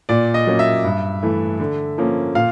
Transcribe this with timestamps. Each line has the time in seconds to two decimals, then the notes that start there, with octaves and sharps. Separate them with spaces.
0.09 A#2 D5
0.34 D#5
0.47 F#3 A#3 C#4
0.59 E5
0.84 G2
1.23 E3 A3
1.60 D3
1.98 F3 A#3 C#4
2.35 A#2 F5